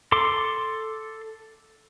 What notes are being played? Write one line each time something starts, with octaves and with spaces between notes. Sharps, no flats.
A4 C6 D6